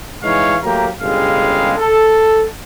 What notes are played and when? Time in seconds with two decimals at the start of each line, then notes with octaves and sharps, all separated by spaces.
0.23 E3 G#3 D#4 C#5 F5
0.63 F#3 A3 A#3 G4 A#5
1.01 G1 C#3 G3 G#3 F5
1.78 A4